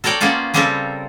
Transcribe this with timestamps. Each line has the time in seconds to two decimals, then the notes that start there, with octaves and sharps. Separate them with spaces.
0.04 A4 A#4 C#5 D5 G5
0.21 A#3 B3 C#4 F4 D5
0.54 C#3 G3 C4 G4 A4 A#4